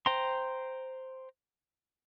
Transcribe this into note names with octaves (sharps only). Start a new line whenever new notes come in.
C5 G5 A#5 C6